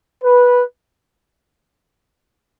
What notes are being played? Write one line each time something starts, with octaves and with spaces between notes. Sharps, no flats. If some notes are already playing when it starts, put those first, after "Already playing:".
B4